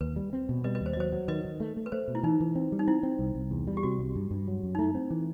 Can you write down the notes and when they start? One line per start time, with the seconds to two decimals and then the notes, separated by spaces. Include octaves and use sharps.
0.01 D#2 B4
0.16 G3
0.33 C4
0.49 B2
0.64 G3 B4 D#5
0.75 B4 D#5
0.81 D#2 C5
0.93 D#5
0.97 F#3 C5
1.12 F#3
1.28 D#3 B4 D#5
1.45 D#3
1.60 A3
1.77 A3
1.86 B4
1.92 A3 C5
2.08 B2
2.15 E4
2.23 E3 D#4
2.40 E3
2.55 C4
2.72 G3
2.79 D#4
2.88 C4 E4
3.03 C4
3.19 C2
3.35 C2
3.51 E2
3.67 G3
3.77 G4
3.83 C3 F#4
3.99 C2
4.16 G2
4.31 G2
4.48 F#3
4.63 F#2
4.75 D#4
4.79 A3 E4
4.95 C4
5.10 E3